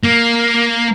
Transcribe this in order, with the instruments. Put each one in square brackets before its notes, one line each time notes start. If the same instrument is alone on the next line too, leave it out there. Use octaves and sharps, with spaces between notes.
[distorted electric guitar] A#3